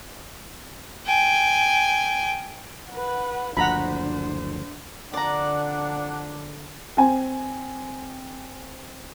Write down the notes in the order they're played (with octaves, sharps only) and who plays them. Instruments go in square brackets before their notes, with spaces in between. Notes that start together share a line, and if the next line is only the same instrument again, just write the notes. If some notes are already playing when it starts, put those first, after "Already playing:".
[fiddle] G5 G#5
[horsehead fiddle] B4 F#5
[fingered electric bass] F#1 D2 F3 [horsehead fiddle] D4 C5 [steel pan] F#5 A#5 B5
[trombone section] F2 D4 [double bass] D3 [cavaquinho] D5 A#5 [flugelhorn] F#5
[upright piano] C4 G#5